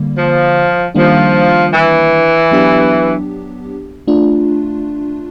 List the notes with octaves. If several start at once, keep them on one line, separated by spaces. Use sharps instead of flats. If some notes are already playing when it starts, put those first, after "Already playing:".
Already playing: D3 G3 A#3
F3
D#3 F3 G3 A#3 D4
E3
F#3 B3 D4 G4
A3 D4 F4